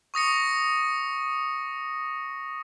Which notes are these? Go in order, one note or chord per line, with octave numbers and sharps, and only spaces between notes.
C#6 D#6 A#6 C#7